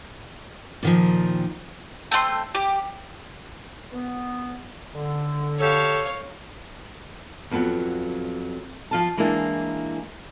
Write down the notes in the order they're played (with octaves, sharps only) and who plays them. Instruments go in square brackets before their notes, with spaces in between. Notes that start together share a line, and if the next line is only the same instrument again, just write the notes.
[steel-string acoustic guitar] A#2 D#3 F3
[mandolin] A3 C4 F#5 C6
G4
[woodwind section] B3
D3
[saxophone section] G4 A4 [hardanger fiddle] C#5 F5
[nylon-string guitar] F2 F#3 B3
F3 F4 A5
E3 G#3 A#3 D4 E4